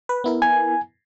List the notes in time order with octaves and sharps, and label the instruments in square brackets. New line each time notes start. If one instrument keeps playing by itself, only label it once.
[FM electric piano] B4
B3 E4 A#4
[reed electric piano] G#5